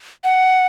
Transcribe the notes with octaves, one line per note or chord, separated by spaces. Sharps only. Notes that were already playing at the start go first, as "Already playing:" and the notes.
F#5